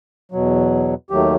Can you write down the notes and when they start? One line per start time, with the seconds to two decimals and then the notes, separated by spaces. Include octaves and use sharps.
0.32 E2 B2 F#3
1.10 D#2 D#3 F#3 A3 G4